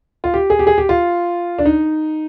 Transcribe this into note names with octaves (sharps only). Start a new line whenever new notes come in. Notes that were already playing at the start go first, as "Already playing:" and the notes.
F4
G4
G#4
G4
G#4
G4
F4
D4
D#4